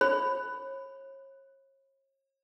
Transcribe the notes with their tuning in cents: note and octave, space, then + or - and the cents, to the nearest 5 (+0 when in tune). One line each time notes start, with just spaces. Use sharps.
C#5 -40 B5 +15